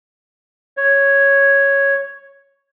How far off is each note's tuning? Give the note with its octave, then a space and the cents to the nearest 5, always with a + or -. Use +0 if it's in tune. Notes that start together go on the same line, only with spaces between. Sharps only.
C#5 +0